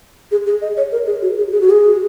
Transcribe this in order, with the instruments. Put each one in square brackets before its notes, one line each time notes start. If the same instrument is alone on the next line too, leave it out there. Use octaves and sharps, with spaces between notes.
[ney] G#4
G#4
D#5
C#5
A#4
G#4
F#4
G#4
G#4
F#4
G#4